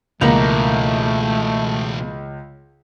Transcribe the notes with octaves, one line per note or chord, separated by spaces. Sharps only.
C#2 B2 E3 A3 A#3 F#5 A#5